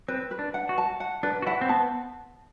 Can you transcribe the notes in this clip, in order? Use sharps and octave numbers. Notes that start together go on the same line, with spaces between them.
C4 B4
B4
D4
F#5
F#4
A5
F#5
D4 B4
F#4
E4 F#5
C4
B3 A5